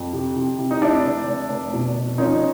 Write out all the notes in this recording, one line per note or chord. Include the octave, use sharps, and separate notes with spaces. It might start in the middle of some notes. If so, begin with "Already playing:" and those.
Already playing: F2
C3
C3
C3
D#4
F1 D4 E4
F1
F1
F1
B2
F1
F3 C#4 D#4